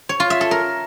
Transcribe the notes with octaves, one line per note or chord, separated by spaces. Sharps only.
C#5
F4
E5
A4
A#4